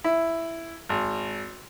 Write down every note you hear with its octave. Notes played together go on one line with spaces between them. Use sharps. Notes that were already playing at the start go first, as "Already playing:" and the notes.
E4
G#1